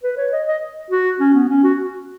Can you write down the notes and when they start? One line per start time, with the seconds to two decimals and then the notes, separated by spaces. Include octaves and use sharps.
0.03 B4
0.17 C#5
0.32 D#5
0.47 D#5
0.90 F#4
1.20 C#4
1.34 B3
1.49 C#4
1.63 F#4